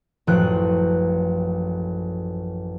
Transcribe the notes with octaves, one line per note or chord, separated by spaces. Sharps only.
A1 F#2 F3 G5 F#6